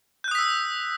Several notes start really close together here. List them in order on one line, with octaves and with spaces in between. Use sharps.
G6 F#6 D#6 B6 E6